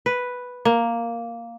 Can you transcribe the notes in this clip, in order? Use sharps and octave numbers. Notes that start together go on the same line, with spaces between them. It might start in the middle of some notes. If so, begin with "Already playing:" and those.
B4
A#3